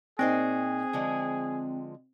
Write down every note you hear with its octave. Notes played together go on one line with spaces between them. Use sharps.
A#2 C4 D#4 G#4 C5
D3 F3 G#3